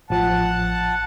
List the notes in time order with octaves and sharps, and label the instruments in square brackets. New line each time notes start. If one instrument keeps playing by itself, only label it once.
[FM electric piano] A1 F3 [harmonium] F#5 A5